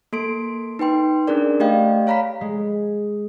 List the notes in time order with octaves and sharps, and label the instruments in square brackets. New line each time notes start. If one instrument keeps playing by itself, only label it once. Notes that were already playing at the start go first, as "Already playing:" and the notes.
[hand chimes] A#3 A4 C6 D7
D#4 B4 G5 C6
C#4 D4 G#4 A#4 D5
A3 G4 D5 D#5 F5 G5
C#5 F5 A#5 B5 B6
[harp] G#3